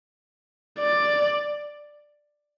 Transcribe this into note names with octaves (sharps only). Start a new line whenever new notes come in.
D5